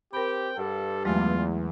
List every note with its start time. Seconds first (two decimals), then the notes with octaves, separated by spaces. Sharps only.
0.13 C4 G4 A#4 G5 B5
0.57 G2 A4 F#5
1.05 E2 F#3 G#3 A3 F4